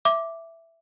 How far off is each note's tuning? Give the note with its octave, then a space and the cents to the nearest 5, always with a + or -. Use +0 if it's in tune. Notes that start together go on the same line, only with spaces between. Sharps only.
E5 +5 D6 -5